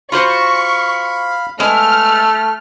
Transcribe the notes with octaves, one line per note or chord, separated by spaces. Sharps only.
F4 F#4 C5 F5 B5 C#6
G#3 A3 B3 E6 F6